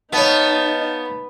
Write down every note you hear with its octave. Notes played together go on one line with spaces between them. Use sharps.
B3 D#4 C#5 F5 A5